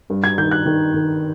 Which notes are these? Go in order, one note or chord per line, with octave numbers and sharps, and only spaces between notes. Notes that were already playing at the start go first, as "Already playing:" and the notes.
G2
G#6
D#3 G6
F#6
D#3
D#3